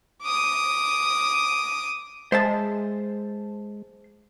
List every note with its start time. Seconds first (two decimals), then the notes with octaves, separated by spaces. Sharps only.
0.23 D6 D#6
2.32 G#3 C5 E5 A5